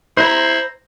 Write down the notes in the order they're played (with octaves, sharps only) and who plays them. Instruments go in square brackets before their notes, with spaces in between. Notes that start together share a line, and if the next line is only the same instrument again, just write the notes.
[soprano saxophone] E4 [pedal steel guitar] C5 A#5